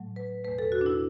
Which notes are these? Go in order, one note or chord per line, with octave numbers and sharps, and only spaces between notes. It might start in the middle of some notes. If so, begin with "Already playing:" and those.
Already playing: A2 F#3 A3
B4
E2 B2 A3 B4
A4
F#4
D4
E4